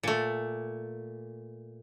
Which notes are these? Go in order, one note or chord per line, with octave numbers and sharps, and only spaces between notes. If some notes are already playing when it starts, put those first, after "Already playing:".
A#2 A3